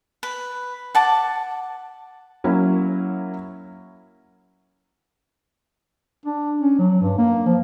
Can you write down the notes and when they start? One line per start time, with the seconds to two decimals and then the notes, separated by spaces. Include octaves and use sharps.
0.23 B4
0.95 F#5 A5 D6
2.44 F#3 A#3 C#4 E4
6.26 D4
6.61 C#4
6.79 F#3
7.02 G2
7.18 A#3
7.46 F3